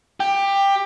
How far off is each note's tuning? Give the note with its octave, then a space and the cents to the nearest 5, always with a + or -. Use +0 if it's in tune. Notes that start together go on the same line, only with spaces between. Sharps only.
G4 +15